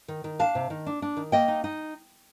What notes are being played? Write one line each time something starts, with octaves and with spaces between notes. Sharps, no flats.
D#3
D#3
D4 F5 A5
C3
D#3
D4
D4
D#3
A#3 D#5 G5
D#4
D#4